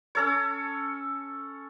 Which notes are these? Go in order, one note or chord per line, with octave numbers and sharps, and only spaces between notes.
C#4 A4 C#5